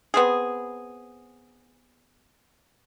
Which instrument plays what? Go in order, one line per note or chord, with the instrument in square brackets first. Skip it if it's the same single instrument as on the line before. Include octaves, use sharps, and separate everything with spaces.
[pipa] B3 C4 G#4